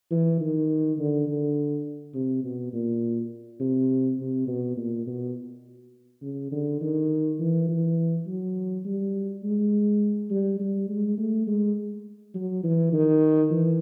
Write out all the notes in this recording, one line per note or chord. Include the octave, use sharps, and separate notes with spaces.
E3
D#3
D3
D3
C3
B2
A#2
C3
C3
B2
A#2
B2
C#3
D3
D#3
E3
E3
F#3
G3
G#3
G3
G3
G#3
A3
G#3
F#3
E3
D#3
E3